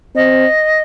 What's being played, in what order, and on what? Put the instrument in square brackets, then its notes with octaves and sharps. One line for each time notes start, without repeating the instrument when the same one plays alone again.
[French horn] C4 [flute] D#5